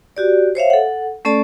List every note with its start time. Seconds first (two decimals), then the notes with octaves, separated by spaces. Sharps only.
0.17 F#4 G4 D5
0.55 C5 C#5 E5 F5
0.70 A4 F#5
1.25 A3 C#4 A4 D5 A5